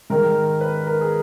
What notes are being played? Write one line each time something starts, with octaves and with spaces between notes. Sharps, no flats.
G#2 D#3 A#4
B4
A#4
G#4